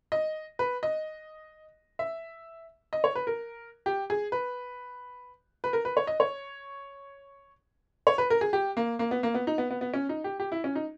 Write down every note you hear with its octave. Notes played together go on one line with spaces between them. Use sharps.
D#5
B4
D#5
E5
D#5
C#5
B4
A#4
G4
G#4
B4
B4
A#4
B4
C#5
D#5
C#5
C#5
B4
A#4
G#4
G4
A#3
A#3
B3
A#3
B3
D#4
B3
B3
B3
C#4
D#4
G4
G4
E4
C#4
D#4